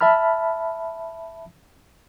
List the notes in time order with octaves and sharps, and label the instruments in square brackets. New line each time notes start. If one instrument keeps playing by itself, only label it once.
[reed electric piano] E5 A5 B5 F6